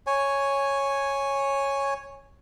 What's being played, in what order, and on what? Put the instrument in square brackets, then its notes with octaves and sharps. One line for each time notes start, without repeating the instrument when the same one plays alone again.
[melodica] C#5 G#5